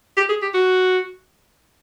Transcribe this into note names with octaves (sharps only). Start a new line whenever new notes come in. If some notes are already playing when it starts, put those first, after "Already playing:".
G4
G#4
G4
F#4